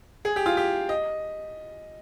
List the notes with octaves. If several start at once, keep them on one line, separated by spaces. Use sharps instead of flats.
G#4
G4
F4
G4
D#5